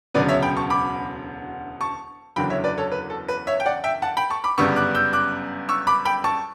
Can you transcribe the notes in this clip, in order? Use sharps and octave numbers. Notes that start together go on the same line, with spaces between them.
E1 D2 C#3 F#3 B3 B4 D5
C#5 E5
G5 B5
A5 C#6
B5 D6
A5 C#6
F#1 E2 D3 F#3 G5 B5
C#5 E5
B4 D5
A4 C#5
B4
A4
B4
C#5 E5
G5
D5 F#5
E5 G5
F#5 A5
G5 B5
A5 C#6
B5 D6
G1 F#2 C#3 G3 B3 C#6 E6
D6 F#6
E6 G6
D6 F#6
C#6 E6
B5 D6
G5 B5
A5 C#6